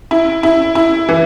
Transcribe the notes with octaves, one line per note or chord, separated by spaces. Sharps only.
E4
E4
E4
E3